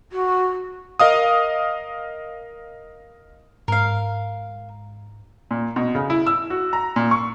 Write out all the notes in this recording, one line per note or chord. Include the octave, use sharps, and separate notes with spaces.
F#4
A#4 D#5 F5 D#6
G#2 A#4 F5
A#2
B2
C#3
E4
E6
F#4
A#5
A#2
C#6